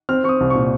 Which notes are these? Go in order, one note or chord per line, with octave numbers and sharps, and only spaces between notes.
C4 F6
C4 C#6 D#6
C2
C#6
A#2